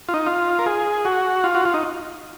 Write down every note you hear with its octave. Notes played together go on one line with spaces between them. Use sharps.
F4
D#4
F4
A#4
G#4
F#4
F4
F#4
F4
D#4